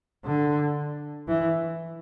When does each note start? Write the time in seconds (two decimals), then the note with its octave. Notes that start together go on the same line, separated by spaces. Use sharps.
0.25 D3
1.28 E3